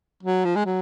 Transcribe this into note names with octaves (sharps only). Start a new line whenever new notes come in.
F#3
F3
G#3
F#3